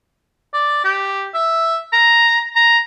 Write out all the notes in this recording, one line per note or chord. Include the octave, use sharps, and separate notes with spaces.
D5
G4
E5
A#5
A#5